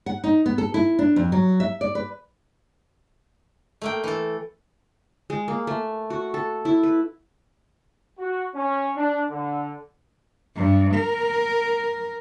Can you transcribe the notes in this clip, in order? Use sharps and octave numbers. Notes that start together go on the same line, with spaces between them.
F#5
D#4
B3
A4
E4
D4
F2
F#3
E5
D5
B4
A3 A#3 G5
E3 A4
G#3
A#3
A3
F#4
A4
E4
B4
F#4
C#4
D4
D3
G2
A#4